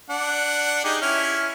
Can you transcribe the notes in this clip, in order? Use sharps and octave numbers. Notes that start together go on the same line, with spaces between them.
D4 F#5
D#4 G4 G#4
C#4 E4 F6